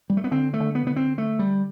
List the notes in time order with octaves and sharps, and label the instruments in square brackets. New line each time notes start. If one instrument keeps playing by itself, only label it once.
[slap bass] G3
A3
B3
[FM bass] D3 [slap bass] C4
[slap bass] A3
[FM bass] D3
[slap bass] B3
[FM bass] C3
[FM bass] D3 [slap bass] B3
[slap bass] C4
A3
G3